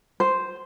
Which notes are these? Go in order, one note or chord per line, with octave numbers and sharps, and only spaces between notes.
C5